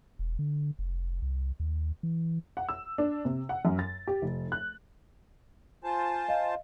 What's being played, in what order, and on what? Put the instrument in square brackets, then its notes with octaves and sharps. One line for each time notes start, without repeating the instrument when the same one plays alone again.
[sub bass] E1
D3
F1
C2
D#2
E3
[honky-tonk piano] F#5
E6
D4
C3
F#5
F#2
A6
G4
F1
F#6
[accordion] F4 C5 A5 [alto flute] G#5
[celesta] D#5 F5